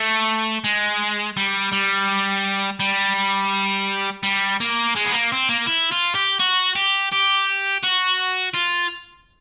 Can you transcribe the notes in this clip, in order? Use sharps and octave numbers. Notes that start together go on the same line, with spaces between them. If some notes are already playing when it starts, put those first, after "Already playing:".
Already playing: A3
G#3
G3
G3
G3
G3
A#3
G#3
B3
A#3
C4
A#3
E4
F4
G4
F#4
G4
G4
F#4
F4